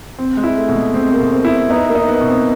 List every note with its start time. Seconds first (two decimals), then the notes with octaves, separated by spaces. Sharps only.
0.19 C4
0.37 G#3
0.44 E4
0.56 A3
0.68 B2
0.75 G#3
0.94 G#3 C4
1.13 A#3
1.19 B2
1.32 C4
1.45 E4
1.70 B3 D#4
1.89 A#3
1.95 D#4
2.08 B3
2.21 B2
2.27 C4